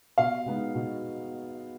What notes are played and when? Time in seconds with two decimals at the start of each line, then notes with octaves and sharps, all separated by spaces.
0.18 B2 F5
0.46 G#3 B3 D#4
0.75 B2